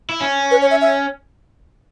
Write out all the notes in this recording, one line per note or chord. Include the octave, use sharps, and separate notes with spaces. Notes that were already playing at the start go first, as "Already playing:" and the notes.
E4
C#4
B4
C#5
E5
E5